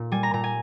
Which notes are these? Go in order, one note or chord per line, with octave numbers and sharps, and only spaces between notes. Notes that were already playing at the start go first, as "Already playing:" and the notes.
Already playing: A#2
G3 G#5
A#5
A#2 A#5
G#5